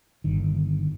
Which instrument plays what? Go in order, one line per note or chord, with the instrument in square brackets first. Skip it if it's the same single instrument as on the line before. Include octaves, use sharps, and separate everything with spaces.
[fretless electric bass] G1 D#3